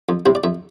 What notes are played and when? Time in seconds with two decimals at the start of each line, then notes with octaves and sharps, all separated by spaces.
0.09 F2
0.26 C3 G3 C4 E4
0.35 D5
0.44 F2 E5